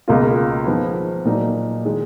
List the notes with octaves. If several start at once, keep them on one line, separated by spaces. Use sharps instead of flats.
C#2 B2 A#3 F4
G#2 F3 B3
A#2 F#3 A#3 D#4
D#3 G#3